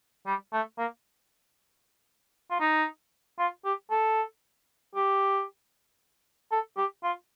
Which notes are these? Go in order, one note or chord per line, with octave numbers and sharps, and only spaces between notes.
G3
A3
A#3
F4
D#4
F4
G4
A4
G4
A4
G4
F4